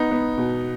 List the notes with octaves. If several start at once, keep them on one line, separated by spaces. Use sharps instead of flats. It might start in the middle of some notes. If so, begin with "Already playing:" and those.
Already playing: B3 D#4
B3
B2